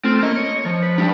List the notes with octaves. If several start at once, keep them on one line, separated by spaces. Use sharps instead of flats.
A3 C4 F4
A#3 C#4 D#5
C#5
F3
B4
G3 D4